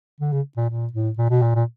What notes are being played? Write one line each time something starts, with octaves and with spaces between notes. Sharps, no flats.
D3
C#3
A#2
A#2
A2
A#2
B2
A#2
A#2